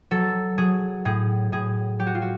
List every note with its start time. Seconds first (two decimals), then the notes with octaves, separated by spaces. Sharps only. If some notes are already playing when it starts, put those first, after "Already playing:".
0.11 F#3 A4
0.58 F#3 G#4
1.05 A2 G#4
1.52 A2 G#4
1.99 F#3 G4
2.07 F#4
2.15 F4
2.22 F#4